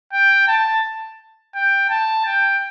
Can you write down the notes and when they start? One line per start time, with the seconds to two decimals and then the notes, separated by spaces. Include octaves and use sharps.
0.13 G5
0.48 A5
1.55 G5
1.90 A5
2.25 G5